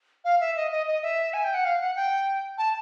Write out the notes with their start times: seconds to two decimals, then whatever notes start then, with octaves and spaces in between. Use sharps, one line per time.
0.25 F5
0.40 E5
0.56 D#5
0.72 D#5
0.87 D#5
1.03 E5
1.33 G#5
1.44 G5
1.54 F#5
1.65 F5
1.80 F#5
1.96 G5
2.58 A5